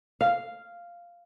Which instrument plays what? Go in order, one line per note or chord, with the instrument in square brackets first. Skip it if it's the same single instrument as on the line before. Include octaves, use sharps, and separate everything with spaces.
[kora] F5